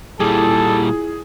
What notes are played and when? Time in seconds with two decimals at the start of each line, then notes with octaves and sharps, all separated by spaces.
0.20 A#2 G3 E4 F4 G#4 A4